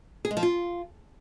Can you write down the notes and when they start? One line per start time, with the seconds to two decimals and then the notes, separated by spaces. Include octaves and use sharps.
0.25 G#4
0.31 G#3
0.37 F3
0.43 F4